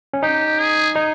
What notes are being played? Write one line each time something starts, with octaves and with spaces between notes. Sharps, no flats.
C#4
D#4 G4
G#4
D#4